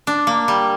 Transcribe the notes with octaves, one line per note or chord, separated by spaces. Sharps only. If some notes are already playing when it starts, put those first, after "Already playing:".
D4
A#3
G3